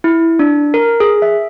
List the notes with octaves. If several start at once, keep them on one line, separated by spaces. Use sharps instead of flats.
E4
D4
A#4
G#4
E5